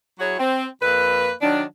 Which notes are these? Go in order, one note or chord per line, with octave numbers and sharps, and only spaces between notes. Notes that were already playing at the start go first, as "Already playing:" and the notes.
F#3 E4 F#4 G#4 C#5
C4
F2 A#3 B4
D#3 F#3 D4